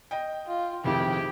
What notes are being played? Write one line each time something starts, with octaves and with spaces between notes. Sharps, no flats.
D#5 G5
F4
F1 F2 D#3 E4 G4 G#4 G5